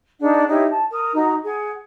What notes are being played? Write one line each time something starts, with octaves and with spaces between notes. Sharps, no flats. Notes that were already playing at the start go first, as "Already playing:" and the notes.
D4 D#4 G#4 F#5
D#4 E4 G4 C#5
A5
A#4 D#6
D#4 F#4 A#5
G#4 F#5